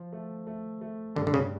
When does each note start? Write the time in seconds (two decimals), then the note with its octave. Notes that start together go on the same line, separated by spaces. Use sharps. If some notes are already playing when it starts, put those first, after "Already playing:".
Already playing: F3
0.13 A3
0.47 A3
0.81 A3
1.15 G2 D3
1.27 D3
1.34 C#3